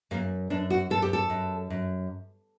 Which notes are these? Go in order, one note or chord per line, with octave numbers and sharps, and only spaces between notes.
F#2 A#3
F#2 D4
F#4
F#2 A4
G4
A4
F#2
F#2